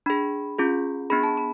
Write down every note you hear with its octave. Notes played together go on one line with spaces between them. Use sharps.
D4 G#4 B5
C#4 F4 G#4
B3 D4 G#4 B5
A5
B5